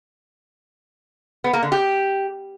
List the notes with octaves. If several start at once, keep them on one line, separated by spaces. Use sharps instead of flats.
B3
A#3
D3
G4